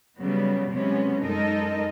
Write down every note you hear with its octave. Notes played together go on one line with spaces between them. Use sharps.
C#3 F#3 G3 B3
C3 F#3 G#3 B3 C#4
F#2 G#3 D#4 A4 A#4 D#5